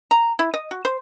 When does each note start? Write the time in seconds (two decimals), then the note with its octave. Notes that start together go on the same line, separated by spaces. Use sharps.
0.11 A#5
0.39 E4
0.54 D#5
0.71 F#4
0.85 C5